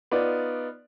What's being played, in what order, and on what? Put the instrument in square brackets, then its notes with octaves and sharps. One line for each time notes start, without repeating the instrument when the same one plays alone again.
[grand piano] B3 D#4 F4 D5